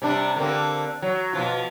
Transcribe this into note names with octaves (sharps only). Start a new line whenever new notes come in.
C3 G3 D4
D3 A#3 C4
F#3
B2 F3 F4